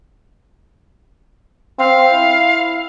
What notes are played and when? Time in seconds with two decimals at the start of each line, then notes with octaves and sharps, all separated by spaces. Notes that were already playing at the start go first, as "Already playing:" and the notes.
1.79 C4 F5
2.12 E4